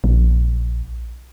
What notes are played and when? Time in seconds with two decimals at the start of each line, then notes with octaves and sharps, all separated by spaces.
0.04 A#1